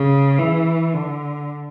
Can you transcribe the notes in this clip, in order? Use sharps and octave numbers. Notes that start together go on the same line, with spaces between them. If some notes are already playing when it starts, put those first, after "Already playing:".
Already playing: C#3
E3
D3